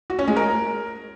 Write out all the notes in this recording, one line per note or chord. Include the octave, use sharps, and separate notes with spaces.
F#4
C#4
G#3
A#4